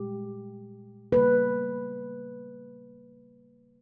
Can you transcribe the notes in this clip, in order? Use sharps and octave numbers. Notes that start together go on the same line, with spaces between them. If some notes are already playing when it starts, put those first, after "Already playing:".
Already playing: A#2 G#3 G4
C#3 G3 A#3 B4